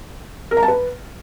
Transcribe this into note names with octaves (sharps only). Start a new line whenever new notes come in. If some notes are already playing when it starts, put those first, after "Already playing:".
A#4
A#5
A5
B4